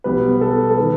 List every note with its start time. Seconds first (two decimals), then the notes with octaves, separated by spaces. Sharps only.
0.04 B1 B2 G3 B3 B4
0.41 A4
0.70 A4
0.78 D#3 B4